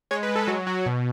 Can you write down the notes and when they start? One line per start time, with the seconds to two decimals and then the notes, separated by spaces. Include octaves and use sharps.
0.11 G#3 C#5
0.23 B4
0.29 G#3
0.36 A4
0.47 F#3 F#4
0.67 F#3 F#4
0.86 B2